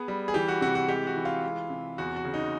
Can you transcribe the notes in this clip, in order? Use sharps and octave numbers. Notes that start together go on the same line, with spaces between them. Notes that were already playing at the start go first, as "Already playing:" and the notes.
Already playing: B3 G#4
G3
G#4
E3 G4
F#4
C3 F#4
F#4
G#3 G4
F#4
E3
F4
G#3
C3
E2 F#4
F#4
C#3
D#4